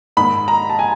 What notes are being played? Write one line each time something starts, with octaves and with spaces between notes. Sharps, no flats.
G#2 D#3 B5
A#5
A5
G#5